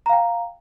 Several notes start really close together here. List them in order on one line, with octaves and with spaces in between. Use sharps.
A#5 F5 G5